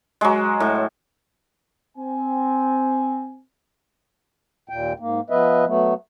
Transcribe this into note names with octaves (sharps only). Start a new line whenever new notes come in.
F#3 G#3
A2
C4 G#5
D#2 A#2 G5
G#2 A#3
F3 B3 B4 D#5 E5
F#3 A3 B3